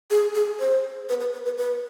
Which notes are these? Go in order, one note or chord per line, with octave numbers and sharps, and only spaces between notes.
G#4
G#4
C5
B4
B4
B4
B4
B4